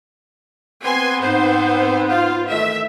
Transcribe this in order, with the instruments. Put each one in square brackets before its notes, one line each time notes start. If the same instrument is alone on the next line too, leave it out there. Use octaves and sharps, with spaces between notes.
[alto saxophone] B3 [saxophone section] C4 B4 [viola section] G#5 C6
[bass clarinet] G#2 [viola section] C5
[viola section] F4 [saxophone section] C5 F5
[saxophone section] D#3 E3 A3 [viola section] E5